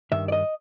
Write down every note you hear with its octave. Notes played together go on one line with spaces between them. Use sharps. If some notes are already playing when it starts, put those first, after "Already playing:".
G2 D#3 E5
D5
D#5